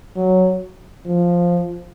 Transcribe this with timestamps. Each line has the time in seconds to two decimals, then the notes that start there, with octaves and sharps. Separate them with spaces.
0.16 F#3
1.06 F3